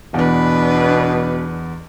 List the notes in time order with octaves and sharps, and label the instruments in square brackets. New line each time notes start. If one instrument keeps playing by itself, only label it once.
[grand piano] E2 [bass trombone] B2 [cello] D4 B4